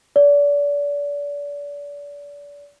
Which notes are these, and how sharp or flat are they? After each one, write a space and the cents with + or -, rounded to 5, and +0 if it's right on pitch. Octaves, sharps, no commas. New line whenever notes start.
D5 -35